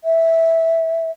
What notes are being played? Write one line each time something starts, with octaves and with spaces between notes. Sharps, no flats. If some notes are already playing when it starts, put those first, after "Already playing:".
E5